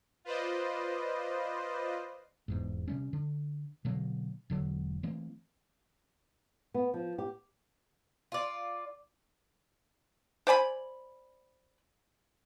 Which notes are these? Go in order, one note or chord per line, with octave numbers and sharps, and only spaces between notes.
F4 B4 C5 D5 D#5
E1 E2 G#2
C3 G3 C#4
D3
B2 D3 F#3 A#3
E1 D3 F#3
E3 A3 A#3 C4
B3
F3
G4
F4 D5
C5 D5 G#5 B5